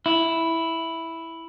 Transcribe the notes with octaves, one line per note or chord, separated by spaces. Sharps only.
E4